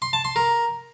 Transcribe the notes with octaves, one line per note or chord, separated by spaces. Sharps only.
C6
A5
C6
A#4